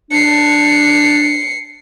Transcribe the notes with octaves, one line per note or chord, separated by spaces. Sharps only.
D4 C7 C#7